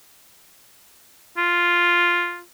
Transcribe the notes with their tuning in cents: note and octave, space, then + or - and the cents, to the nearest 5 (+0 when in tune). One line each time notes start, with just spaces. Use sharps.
F4 +0